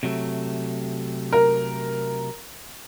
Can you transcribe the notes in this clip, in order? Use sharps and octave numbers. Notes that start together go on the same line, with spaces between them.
C3 F#3 A3
A#4